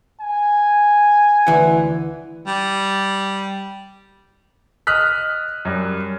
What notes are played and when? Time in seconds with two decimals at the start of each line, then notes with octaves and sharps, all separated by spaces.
0.21 G#5
1.47 D2 E3 F#5
2.47 G3
4.87 D#5 D#6 F6 F#6 B6
5.65 F#2 G3